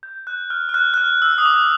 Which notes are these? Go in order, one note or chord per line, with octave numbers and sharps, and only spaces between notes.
G6
F#6
F6
F6
F#6
F#6
F6
E6
D#6
D6